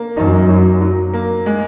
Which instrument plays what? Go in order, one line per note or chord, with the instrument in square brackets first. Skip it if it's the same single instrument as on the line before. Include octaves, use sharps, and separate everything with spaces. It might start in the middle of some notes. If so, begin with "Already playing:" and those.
Already playing: [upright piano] A#3
[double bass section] F#2 [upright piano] D#4
[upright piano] F#3
F#3
A#3
G#3